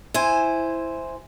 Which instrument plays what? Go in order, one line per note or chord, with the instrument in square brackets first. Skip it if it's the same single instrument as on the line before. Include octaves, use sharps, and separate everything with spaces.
[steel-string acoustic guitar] E4 C5 G#5